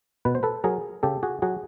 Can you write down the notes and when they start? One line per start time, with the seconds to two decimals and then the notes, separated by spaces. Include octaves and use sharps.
0.25 B2 B4
0.35 C5
0.43 A4 B4
0.64 F#3 G#4 A#4
1.03 C#3 G4 A4
1.23 F#4 G#4
1.42 F#3 F#4 G#4